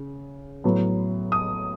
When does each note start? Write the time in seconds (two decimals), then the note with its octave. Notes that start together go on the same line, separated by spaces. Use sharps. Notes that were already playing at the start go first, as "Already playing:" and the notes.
Already playing: C#3
0.64 A2 F#3 B3
1.32 D#6